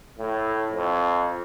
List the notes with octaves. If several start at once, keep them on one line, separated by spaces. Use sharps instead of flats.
A2
F2